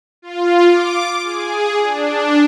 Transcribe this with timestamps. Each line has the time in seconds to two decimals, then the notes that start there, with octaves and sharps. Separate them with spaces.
0.22 F4
0.69 D6
1.24 G#4
1.83 D4